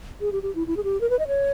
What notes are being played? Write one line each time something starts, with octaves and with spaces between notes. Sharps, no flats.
G#4
G4
G4
E4
E4
G#4
G4
A#4
B4
D#5
C#5